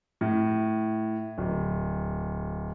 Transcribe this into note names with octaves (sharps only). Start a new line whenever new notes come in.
A2
D1